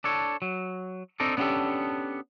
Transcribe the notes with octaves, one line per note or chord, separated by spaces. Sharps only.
D4 A4 C#5
F#3
C4 D4 D#4 A4 D5
B3 C#4 D4 F4 G4 A4